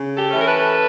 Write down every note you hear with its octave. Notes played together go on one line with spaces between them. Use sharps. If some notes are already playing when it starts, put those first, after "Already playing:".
Already playing: C#3
G4 A4
E3 A3 C#4
A#4
A4 B4